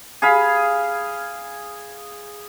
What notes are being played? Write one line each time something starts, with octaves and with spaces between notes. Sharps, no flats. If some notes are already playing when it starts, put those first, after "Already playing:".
G#4 F5 B5